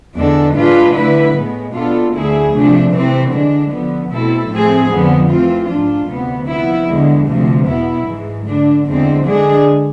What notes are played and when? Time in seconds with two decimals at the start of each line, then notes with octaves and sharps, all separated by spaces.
0.16 E2 D3 G#3 D4 A4
0.55 A2 G#3 D4 F4 B4
0.94 D3 A3 E4 B4
1.35 A2 G#3 B3
1.74 B2 B3 D4 F4 A4
2.14 D2 D3 A3 E4 G#4
2.53 C3 F3 A3 D4
2.92 C3 E3 A3 C4
3.32 D3 G#3 D4
3.71 D3 F3 B3
4.11 B2 A3 C4 E4 A4
4.50 A2 F3 A3 C4 G#4
4.90 F2 D3 F3 B3
5.29 E3 A3 C4 F4
5.68 G#2 F3 A3 D4 F4
6.08 D2 C3 E3 B3
6.48 F3 B3 E4
6.87 E2 D3 G#3
7.27 D2 C3 F3
7.66 E2 B2 B3 E4
8.06 G#2 E3 G#3
8.46 D3 A3 D4
8.86 E2 D3 G#3 C4
9.25 D3 G#3 D4 G#4